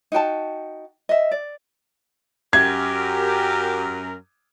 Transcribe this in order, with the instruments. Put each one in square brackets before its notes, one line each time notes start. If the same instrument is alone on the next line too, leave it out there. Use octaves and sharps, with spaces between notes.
[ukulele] D#4 F#4 G5 A5
D#5 E5
D5
[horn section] F#2 A#4 [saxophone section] G4 [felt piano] G#6